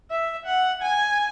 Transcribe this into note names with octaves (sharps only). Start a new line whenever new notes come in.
E5
F#5
G#5